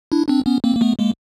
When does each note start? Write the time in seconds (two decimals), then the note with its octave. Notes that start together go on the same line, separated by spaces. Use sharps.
0.12 D4 E4
0.28 C4 D4
0.46 B3 C#4
0.64 A#3 C4
0.77 A#3
0.81 A3 B3
0.99 G#3 A#3